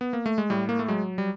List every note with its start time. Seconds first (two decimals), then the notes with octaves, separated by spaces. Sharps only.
0.01 B3
0.13 A#3
0.26 A3
0.38 G#3
0.50 A2 G3
0.69 A#3
0.79 A3
0.88 F#3 G#3
1.18 G3